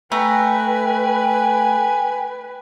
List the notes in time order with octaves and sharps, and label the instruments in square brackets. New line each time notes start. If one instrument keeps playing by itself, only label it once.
[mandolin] A3 A#5 [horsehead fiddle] B4 [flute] G5 [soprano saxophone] G#5